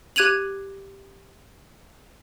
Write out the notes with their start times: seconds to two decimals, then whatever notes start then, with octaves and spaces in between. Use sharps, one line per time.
0.16 G4 F#6 G#6 D#7 F7 F#7